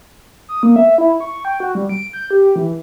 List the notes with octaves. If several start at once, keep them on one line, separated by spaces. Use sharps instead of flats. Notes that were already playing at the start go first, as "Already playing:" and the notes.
D#6
A#3
E5
E4
C#6
G5
F#4
G3
D7
G6
G4
E3